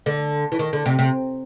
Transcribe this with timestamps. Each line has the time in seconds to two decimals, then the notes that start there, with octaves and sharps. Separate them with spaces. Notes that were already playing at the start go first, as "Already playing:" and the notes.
0.06 D3
0.52 E3
0.59 D#3
0.73 D3
0.86 C3
0.99 C3